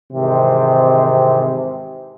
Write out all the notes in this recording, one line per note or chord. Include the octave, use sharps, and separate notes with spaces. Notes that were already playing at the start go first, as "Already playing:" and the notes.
G#2 C3 D#3 E3 C4